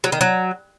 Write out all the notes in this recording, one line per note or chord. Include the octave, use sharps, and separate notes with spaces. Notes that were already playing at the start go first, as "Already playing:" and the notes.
F#3
D#3
F#3